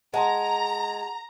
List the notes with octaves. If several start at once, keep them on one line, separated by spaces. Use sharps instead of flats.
G#3 F#5 A5 A#5 C6